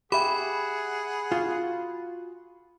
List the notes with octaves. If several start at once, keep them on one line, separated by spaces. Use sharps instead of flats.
G4 G#4 E5 F#5 B5
F4 F#4